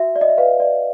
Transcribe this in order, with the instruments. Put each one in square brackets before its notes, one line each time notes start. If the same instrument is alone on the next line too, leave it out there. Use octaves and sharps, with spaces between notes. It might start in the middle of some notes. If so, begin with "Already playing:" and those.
Already playing: [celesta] F#4 E5
D5
D#5
E5
B4 F5
D5